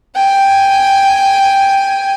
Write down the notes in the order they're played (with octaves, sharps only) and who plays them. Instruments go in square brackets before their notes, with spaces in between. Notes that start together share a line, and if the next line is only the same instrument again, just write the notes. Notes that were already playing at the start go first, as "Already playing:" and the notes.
[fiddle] G5 G#5